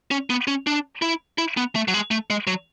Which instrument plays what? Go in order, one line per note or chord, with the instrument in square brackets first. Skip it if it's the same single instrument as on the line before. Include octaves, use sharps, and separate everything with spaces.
[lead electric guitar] C#4
B3
C#4
D4
E4
E4
B3
A3
F#3
G#3
A3
G#3
F#3